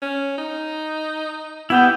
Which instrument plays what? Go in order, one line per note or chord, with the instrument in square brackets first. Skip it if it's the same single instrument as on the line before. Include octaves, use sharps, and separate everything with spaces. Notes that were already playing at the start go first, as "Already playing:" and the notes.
[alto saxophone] C#4
D#4
[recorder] B3 [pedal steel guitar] E4 G4 G5